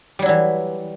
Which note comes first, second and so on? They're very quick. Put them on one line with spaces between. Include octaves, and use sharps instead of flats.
G3 F#3 E4 E3